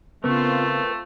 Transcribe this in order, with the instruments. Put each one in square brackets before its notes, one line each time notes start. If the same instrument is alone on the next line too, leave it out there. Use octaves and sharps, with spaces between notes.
[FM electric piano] C#3 B3 [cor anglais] A3 [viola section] C4 F4 [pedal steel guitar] A#4 B4 C#6